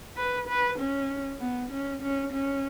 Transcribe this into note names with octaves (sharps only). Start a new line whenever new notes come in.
B4
B4
C#4
B3
C#4
C#4
C#4